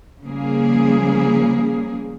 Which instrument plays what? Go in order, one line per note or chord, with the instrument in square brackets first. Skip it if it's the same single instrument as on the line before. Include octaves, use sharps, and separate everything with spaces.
[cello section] C#3 F3 G3 A#3 G#4